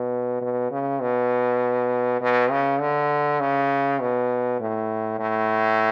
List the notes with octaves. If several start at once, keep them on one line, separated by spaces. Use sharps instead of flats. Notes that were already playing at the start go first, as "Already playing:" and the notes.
Already playing: B2
B2
C#3
B2
B2
C#3
D3
C#3
B2
A2
A2